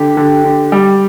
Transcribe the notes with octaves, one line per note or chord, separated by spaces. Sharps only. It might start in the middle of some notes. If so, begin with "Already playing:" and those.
Already playing: D3 G4
D3
D3
G3